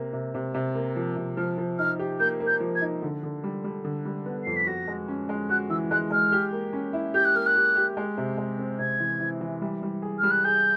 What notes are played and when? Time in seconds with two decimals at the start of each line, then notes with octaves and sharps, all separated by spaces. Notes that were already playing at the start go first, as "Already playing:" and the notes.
Already playing: C3 A#3
0.13 C3
0.34 C3
0.54 C3
0.75 A#3
0.96 F3
1.16 C3
1.37 F3 F6
1.58 F3
1.78 D#4 F6
1.99 G4
2.20 A#3 G6
2.40 A#3
2.47 G6
2.60 F3
2.75 G#6
2.82 D#4
3.02 D3
3.23 D3
3.44 G3
3.64 G3
3.85 D3
4.05 G3
4.26 B3
4.44 F2 C7
4.56 B6
4.67 F#4 A#6
4.88 G#3
5.08 C#4
5.29 G#3
5.49 F#4 F#6
5.70 E3 E6
5.91 G#3 F#6
6.11 G#3 F6
6.32 G4
6.52 A#3
6.73 C#4
6.93 E4
7.14 G4 G6
7.25 F#6
7.35 A#3 F6
7.46 F#6
7.55 G4
7.76 G4
7.97 G#3
8.18 C3
8.38 G#3
8.59 C4
8.79 C3 G#6
9.00 E3
9.20 E3
9.41 E3
9.62 G3
9.83 G3
10.02 G#4
10.18 F6
10.23 G3
10.30 F#6
10.44 G#4 G6